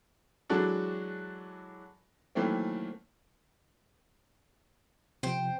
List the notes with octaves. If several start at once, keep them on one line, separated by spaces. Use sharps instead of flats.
E3 F#3 G#3 D4 F#4 A4
D#3 E3 F#3 A3 A#3 C4
C3 F3 C5 G5